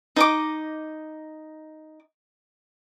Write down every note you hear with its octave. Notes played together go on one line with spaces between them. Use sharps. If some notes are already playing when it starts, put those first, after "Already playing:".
D#4 D#5 D6